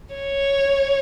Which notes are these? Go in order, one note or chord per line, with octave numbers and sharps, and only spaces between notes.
C#5